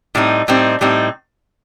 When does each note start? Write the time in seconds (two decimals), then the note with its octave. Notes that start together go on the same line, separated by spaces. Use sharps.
0.15 A2 G3 C4 D#4
0.48 A2 G3 C4 D#4
0.81 A2 G3 C4 D#4